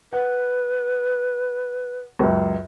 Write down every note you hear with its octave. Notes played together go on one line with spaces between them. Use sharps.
B4 F#5
C#2 F#2